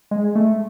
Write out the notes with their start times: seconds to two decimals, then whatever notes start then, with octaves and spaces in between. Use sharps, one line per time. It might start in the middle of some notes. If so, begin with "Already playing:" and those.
0.11 G#3
0.35 A3